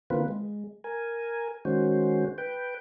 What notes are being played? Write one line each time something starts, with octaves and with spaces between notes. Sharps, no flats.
D3 E3 A#3 C4 F4 B4
G#3
A#4 G#5
D#3 G#3 C#4 F#4 C5
B4 G5